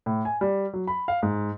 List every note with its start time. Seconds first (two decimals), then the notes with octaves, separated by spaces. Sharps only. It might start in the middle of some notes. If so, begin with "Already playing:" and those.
0.06 A2
0.25 G#5
0.41 G3
0.73 F#3
0.87 B5
1.08 F5
1.23 G#2